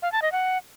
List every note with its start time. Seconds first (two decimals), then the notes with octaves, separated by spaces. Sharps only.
0.02 F5
0.12 A5
0.22 D#5
0.32 F#5